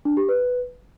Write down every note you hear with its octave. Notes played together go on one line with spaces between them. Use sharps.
D4
G4
B4